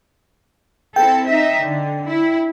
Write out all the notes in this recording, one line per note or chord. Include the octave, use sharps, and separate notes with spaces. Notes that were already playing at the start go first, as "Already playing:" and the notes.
C4 E4 A4 G5
D#4 E5
D3
E4